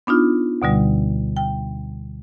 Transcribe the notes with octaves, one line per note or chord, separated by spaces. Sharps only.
B3 D4 D#4 F4
D2 B2 D3 G3
G5